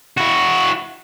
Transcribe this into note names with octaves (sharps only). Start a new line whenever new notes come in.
E4 F#4